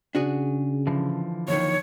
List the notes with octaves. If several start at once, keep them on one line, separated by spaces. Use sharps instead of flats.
C#3 D4 F#4 G#4
D3 E3 F3
D#2 D#3 C#5